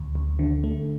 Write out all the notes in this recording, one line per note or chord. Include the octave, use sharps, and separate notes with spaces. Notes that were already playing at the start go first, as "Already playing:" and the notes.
Already playing: D2
D2
D3
A3